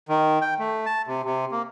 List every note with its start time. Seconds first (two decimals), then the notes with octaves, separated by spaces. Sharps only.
0.09 D#3
0.42 G5
0.59 A3
0.86 A5
1.07 C3
1.25 C3
1.52 A#3